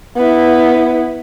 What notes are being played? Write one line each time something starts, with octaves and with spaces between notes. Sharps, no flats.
B3 E4